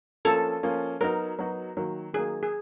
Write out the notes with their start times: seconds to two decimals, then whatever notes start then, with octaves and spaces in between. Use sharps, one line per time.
0.25 F3 A#3 C#4 A4
0.63 F3 A#3 C#4
1.01 F#3 B3 D#4 F#4 A#4
1.39 F#3 B3 D#4 F#4
1.77 D#3 F#3 A#3
2.13 D#3 F#3 A#3 G#4
2.43 G#4